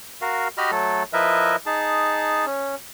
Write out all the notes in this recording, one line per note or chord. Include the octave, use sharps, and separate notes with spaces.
F#4 A#4 F5
F#4 G4 D#5 B5 F6
F#3 A3 A4
F3 E4 A#4 B4 D#5 E5
D#4 G#4 A5
C#4